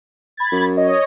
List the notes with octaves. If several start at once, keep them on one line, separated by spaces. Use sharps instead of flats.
B5 G#6 A6
F#2
C#5 D#5